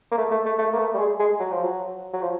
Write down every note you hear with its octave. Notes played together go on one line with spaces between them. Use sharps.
A#3
A3
A3
A3
A3
A#3
A3
G3
G#3
G#3
F#3
F3
F#3
F#3
F3